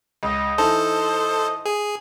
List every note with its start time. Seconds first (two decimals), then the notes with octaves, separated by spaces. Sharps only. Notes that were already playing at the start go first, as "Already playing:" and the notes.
0.23 C#2 D#5
0.58 E3 D#4 A4 C5 A5
1.66 G#4